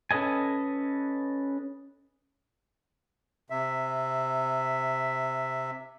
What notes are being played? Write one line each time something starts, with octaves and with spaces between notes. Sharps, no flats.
C#4 A4 B4 D#5 G#5
C3 E5